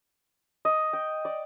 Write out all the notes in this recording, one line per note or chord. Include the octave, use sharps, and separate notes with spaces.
D#5
G5
D5